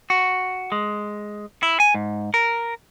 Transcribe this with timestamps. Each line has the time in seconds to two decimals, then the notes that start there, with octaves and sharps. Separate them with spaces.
0.10 F#4
0.72 G#3
1.63 E4
1.80 G#5
1.95 G#2
2.34 A#4